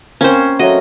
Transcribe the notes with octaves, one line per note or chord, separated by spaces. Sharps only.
A#3 C4 C#4 C5 C6
F#3 A3 F#4 D#5